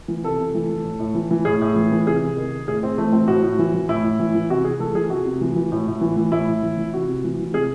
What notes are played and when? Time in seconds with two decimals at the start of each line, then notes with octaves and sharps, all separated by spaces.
0.08 E3
0.24 C3 A4
0.38 C3
0.54 E3
0.70 E3
0.84 A2
1.00 A2
1.15 E3
1.31 E3
1.45 A2 G#4
1.61 A2
1.75 E3
1.92 E3
2.06 C3 G#4
2.22 C3
2.37 D#3
2.51 D#3
2.68 A2 G#4
2.83 A2 C4
2.98 E3 A3
3.12 E3 C4
3.28 A2 F#4
3.43 A2
3.59 E3
3.74 E3
3.89 A2 E4
4.04 A2
4.20 E3
4.35 E3
4.50 C3 F#4
4.64 C3 G#4
4.80 E3 A4
4.95 E3 G#4
5.10 C3 F#4
5.26 C3
5.41 E3
5.56 E3
5.72 A2
5.87 A2
6.01 E3
6.17 E3
6.32 A2 E4
6.48 A2
6.63 E3
6.78 E3
6.93 C3 F#4
7.08 C3
7.24 E3
7.39 E3
7.54 C3 G#4